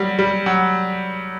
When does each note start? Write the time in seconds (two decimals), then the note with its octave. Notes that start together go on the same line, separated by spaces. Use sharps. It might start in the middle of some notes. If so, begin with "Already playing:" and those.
Already playing: F#3 G3
0.19 G3
0.46 F#3